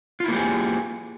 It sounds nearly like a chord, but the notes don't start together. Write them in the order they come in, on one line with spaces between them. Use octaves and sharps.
F4 E4 A#3 G4 G#4